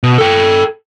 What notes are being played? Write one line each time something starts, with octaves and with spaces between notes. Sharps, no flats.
B2
A4 G5